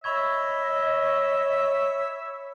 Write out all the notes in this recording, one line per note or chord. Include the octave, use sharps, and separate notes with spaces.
C#5 D#5 E5 B5 C#6 G#6